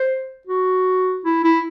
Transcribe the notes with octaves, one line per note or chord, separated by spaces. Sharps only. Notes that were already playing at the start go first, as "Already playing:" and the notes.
Already playing: C5
F#4
E4
E4